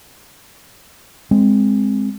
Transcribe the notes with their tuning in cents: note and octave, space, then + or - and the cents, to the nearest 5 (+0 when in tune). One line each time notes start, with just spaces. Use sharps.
G#3 -5 C4 +0